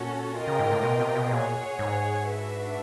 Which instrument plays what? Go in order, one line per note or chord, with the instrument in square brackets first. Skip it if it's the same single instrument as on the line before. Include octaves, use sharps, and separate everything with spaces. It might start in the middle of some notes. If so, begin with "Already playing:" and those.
Already playing: [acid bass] A#2 [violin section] C#4 F#4 A4
[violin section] F4 A#4 D#5 G5
[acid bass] C#3
G#2
A2
B2
C3
B2
[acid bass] A#2 [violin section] G#4 C#5 F#5
[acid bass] G#2
[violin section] D4 F#4 B4 E5